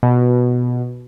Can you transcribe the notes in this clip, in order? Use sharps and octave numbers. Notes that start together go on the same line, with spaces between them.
B2